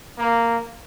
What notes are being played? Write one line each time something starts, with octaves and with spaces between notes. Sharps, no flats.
A#3